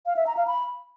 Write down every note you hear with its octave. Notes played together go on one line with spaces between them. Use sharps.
F5
E5
A#5
F5
B5